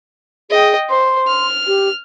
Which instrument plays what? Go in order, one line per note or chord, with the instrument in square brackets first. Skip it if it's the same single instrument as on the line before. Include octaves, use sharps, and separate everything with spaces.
[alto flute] G#4 [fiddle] D#5 G5
[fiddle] C5 [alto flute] C6
[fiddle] F6
[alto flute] G4